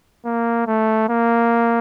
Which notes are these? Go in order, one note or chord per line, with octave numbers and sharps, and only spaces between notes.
A#3
A3
A#3